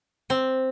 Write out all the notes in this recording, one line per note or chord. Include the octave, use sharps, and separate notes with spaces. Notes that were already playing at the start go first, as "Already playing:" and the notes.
C4